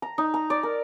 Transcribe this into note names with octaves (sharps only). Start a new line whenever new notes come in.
A#5
D#4
A#5
D5
A#4